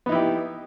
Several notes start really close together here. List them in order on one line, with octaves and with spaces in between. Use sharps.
B3 D#4 E4 G4